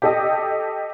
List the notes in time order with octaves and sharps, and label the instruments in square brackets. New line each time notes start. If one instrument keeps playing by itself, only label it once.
[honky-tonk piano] G4 A4 D#5